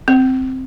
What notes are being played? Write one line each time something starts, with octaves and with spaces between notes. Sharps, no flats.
C4